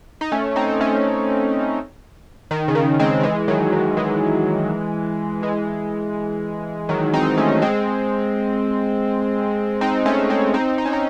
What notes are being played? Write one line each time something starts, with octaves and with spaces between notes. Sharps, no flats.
D#4
A3 C#4
C4 D#4
A3 C#4
D#3
C#3
D#3
G#3 C4
E3 G#3
D#3 F#3
D#3
E3 G#3
E3 G#3
D#3 F#3
C4 D#4
A3 C#4
G#3 C4
C4 D#4
A3 C#4
G#3 C4
C4 D#4
D#4
C#4
C4 D#4